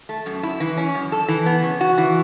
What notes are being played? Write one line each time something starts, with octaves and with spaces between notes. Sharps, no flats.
A3
F#2
E4
E3
C#4
F#2
A4
E3
B3
C#3
F#4
E3